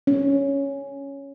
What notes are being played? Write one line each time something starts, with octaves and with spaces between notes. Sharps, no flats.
C#4